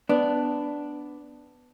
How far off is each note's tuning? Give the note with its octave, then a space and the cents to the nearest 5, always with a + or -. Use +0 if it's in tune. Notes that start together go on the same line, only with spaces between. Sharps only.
B3 +10 D4 +0